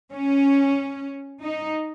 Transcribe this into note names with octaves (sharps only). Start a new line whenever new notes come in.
C#4
D#4